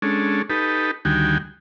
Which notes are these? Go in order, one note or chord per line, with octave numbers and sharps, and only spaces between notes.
G#3 C#4 D4 A4
D#4 G4 A4 B4
D2 D#3 G3 F#4 G5 G#5